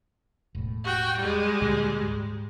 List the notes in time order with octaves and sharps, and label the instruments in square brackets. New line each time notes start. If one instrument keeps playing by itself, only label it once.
[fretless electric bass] E1 A2
[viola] F#4 G5
G3 G#3
[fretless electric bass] D2 A#2
G#2